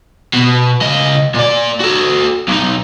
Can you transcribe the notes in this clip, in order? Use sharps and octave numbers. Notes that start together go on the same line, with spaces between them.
B2
C#3 D#5
A#2 D5
F#4 A4
B1 D#4